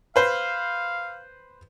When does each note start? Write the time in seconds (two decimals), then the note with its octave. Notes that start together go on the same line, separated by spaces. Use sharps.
0.16 B4 C5 F5